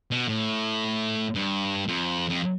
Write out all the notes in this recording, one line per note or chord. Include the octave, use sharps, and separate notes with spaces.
B2
A2
G2
F2
F2